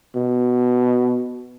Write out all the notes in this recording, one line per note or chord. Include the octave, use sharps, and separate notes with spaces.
B2